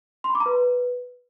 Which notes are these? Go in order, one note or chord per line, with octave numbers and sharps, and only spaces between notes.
C6
B5
D6
A#5
B4